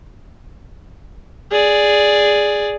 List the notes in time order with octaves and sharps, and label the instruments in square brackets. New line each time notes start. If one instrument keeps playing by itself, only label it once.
[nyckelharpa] G#4 D5